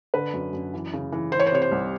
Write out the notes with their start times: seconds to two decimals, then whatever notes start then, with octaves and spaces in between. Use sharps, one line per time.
0.14 D3 B4
0.33 F#2
0.53 F#2
0.74 E3
0.93 C#3
1.12 E3
1.32 E3 C5
1.40 C#5
1.47 C5
1.52 C3 C#5
1.62 C5
1.72 C2